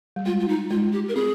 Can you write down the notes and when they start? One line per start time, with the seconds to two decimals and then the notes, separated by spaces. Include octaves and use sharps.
0.16 G3
0.26 G#3 F4
0.40 F4
0.48 D#4
0.70 G#3 F4
0.93 G4
1.08 A#4
1.16 C4 G#4